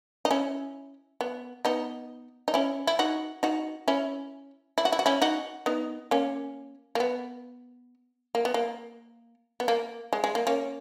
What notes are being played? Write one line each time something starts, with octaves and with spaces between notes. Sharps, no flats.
D#4
C#4 E4
B3
B3 D#4
D#4
C#4 E4
E4
D#4 F#4
D#4 F#4
C#4 E4
E4
F#4
E4
F#4
C#4 E4
D#4 F#4
B3 D#4
A#3 C#4
A#3
B3
A#3
B3
A#3
B3
A#3
G#3
G#3
A#3
A#3 C#4